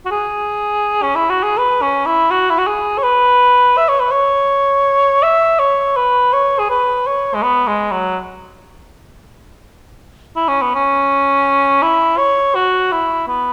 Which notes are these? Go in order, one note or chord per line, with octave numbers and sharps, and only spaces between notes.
F#4
G#4
C#4
E4
F#4
G#4
B4
C#4
E4
F#4
E4
F#4
G#4
C#5
B4
E5
C#5
B4
C#5
E5
C#5
B4
C#5
G#4
B4
C#5
G#3
B3
G#3
F#3
E4
C#4
B3
C#4
E4
C#5
F#4
E4
B3